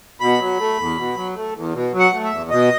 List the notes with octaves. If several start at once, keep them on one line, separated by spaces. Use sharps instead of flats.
B2 B5
F#3
A3
E2
B2
F#3
A3
E2
B2
F#3
F#5
A3
E5
E2
B2 D#5